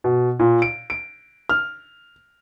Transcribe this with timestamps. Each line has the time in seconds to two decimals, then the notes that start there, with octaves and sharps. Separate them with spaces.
0.04 B2
0.39 A#2
0.62 D7
0.90 D7
1.49 F6